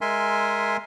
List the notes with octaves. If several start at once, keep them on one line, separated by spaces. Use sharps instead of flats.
G#3 A#4 E5 G#5 C6